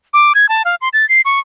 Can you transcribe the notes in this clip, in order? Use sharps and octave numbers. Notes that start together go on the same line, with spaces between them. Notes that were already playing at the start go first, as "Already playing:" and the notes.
D6
G#6
A5
F5
C6
A6
C7
C#6